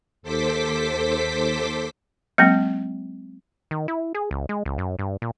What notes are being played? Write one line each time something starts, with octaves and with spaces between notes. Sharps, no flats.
D#2 A4 C5 D6 B6
F#3 G#3 A#3 C4
D#3
E4
G#4
C#2
G#3
C#2
F#2
G2
A#2